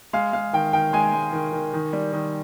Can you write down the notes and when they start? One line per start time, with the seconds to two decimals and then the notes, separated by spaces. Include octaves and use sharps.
0.13 G#3 F5
0.33 G#3 F5
0.53 D#3 G5
0.73 D#3 G5
0.93 G#3 G#5
1.13 G#3
1.33 D#3
1.53 D#3
1.73 D#3
1.93 G3
2.13 D#3